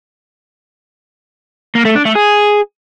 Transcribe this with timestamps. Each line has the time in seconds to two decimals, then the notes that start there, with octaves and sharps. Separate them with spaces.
1.75 A#3
1.85 A3
1.95 D4
2.05 A3
2.15 G#4